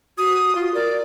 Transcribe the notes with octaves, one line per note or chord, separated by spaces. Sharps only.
F#4 D#6
F4
A#4 D5